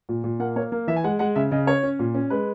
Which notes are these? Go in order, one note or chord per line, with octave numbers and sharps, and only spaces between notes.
A#2
A#2
A#3 F#5
A#3 C#5
A#3
E3 E5
G#5
G#3 F#5
G#3 F#5
C#3 E5
C#3 D#5
C#4 C#5
C#4
A#2
C#4
G#3 B4